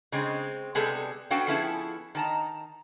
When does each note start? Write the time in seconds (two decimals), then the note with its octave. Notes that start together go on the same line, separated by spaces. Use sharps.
0.12 C#3 G#3 C4
0.75 C3 G3 G#3 B3 G#4 A4
1.31 B3 C#4 F#4 A4 F5 G5
1.47 F3 B3 C#4 E4 G#4 A4
2.15 D#3 A5 A#5